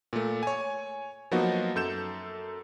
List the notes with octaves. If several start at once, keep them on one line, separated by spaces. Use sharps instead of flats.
A#2 A3
C#5 G#5
F3 F#3 A#3 B3 D#4 F#4
F#2 A4 G6 E7